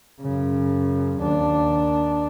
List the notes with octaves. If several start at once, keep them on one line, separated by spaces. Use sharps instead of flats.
F#2 C#3
D#2 D4